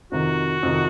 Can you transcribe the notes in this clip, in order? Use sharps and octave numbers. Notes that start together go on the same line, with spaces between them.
F2 C3 D#3 F#4
F2 C3 D#3